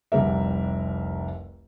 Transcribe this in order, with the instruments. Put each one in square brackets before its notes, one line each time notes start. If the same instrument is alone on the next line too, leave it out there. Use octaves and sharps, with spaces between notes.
[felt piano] F1 C2 G3 A#4 E5